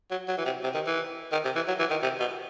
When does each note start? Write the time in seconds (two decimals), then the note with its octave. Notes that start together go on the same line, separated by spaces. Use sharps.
0.11 F#3
0.28 F#3
0.37 E3
0.45 C3
0.63 C3
0.74 D#3
0.87 E3
1.32 D#3
1.44 C3
1.55 E3
1.68 F#3
1.79 E3
1.90 D#3
2.02 C3
2.20 B2